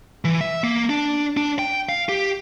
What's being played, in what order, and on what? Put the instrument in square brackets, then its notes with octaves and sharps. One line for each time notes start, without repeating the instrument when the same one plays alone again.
[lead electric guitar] E3
E5
A#3
D4
D4
G5
F5
G4